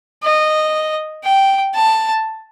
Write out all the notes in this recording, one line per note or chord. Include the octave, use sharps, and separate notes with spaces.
D#5
G5
A5